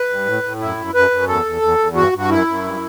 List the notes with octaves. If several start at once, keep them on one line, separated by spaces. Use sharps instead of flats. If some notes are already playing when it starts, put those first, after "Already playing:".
Already playing: B4
G2
A2
A2
F#2 E4
F#2
F#2 B4
F#2
E2 A4
E2
E2
E2
G2 F#4
G2
F#4
F#2 E4
F#2
G2